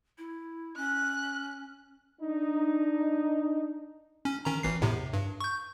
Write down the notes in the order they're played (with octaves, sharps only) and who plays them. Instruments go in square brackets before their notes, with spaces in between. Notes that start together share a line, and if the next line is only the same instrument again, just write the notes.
[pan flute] E4
[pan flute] C#4 [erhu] F#6
[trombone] D4 [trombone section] D#4
[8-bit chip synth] C#4
D#3 C#4 A#5
G#1 E3 C7
E2 A2 C3
G2
C#6 G6